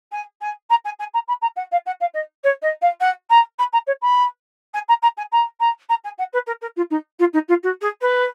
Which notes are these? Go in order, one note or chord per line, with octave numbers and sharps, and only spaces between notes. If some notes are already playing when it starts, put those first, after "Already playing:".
G#5
G#5
A#5
G#5
G#5
A#5
B5
A#5
F#5
F5
F#5
F5
D#5
C#5
D#5
F5
F#5
A#5
B5
A#5
C#5
B5
G#5
A#5
A#5
G#5
A#5
A#5
A#5
G#5
F#5
B4
A#4
A#4
F4
D#4
F4
D#4
F4
F#4
G#4
B4